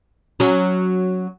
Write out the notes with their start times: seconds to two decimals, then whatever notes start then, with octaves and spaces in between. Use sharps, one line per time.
0.40 F#3 C#4